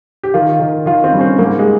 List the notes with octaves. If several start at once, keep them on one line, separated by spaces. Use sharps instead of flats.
G4
D#3 F4
D#3
D#3 F4
C4
G2 C#4
C4
G#2 A#3
G#3